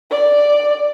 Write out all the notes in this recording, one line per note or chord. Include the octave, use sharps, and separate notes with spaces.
D5